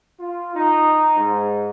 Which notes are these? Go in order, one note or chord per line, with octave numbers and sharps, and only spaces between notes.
F4
D#4
G#2